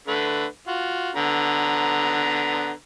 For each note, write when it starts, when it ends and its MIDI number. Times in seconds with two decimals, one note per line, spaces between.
0.08 0.45 50
0.08 0.45 57
0.08 0.45 71
0.67 1.10 65
0.67 1.10 66
1.16 2.71 50
1.16 2.71 59
1.16 2.71 82